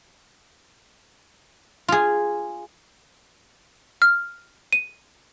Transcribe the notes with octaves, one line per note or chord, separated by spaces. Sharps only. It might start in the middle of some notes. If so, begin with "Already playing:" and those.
F4 G#4
F6
D#7